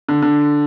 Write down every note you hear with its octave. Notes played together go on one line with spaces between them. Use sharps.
D3
D3